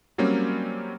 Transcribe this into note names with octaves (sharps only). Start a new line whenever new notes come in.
F#3 G3 A#3 C4 C#4